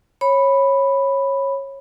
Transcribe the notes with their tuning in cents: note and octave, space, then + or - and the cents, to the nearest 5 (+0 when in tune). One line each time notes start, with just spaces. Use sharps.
C#5 -20 B5 +0